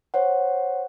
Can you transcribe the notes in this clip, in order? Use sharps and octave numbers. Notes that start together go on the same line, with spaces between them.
C5 C#5 F#5